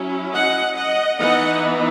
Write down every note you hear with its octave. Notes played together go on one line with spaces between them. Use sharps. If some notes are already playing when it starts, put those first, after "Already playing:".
Already playing: F#3 C#4 E4
D#5 F#5
D#5 F#5
E3 B3 D#4 D#5 F#5